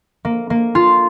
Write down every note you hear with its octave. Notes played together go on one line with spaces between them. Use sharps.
A#3
A#3
F4